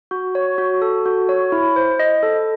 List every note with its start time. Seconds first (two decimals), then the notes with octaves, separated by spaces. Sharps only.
0.11 F#4
0.35 C#5
0.58 F#4
0.82 A4
1.06 F#4
1.29 C#5
1.52 E4
1.76 C5
1.99 D#5
2.23 A4